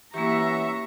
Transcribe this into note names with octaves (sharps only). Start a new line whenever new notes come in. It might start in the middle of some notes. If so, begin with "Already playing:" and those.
E3 A#3 C#4 F#4 G4 E5 A#5 C#6